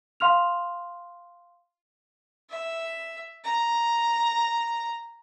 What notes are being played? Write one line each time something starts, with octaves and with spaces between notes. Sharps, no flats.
F5 C6 F6 F7
E5
A#5